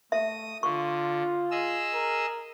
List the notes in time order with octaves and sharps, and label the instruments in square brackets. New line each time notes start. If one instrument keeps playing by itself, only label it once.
[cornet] A3 [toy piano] E5 [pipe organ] D#6
[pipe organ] D3 [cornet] F4 [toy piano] C#6
[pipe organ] G#4 D#5 E6
[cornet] A#4